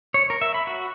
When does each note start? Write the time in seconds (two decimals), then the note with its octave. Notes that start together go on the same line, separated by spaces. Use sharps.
0.14 C#5
0.30 A#4
0.41 E5
0.54 B5
0.67 F#4